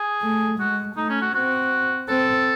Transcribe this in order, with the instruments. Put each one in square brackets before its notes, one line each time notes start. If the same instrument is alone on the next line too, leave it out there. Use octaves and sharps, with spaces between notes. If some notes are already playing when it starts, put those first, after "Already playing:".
Already playing: [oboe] G#4
[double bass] A3
[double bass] G#3 [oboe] F#4
[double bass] A3 [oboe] D#4
[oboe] C#4
F#4
[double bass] C4 [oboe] F#4
[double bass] C4 [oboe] A4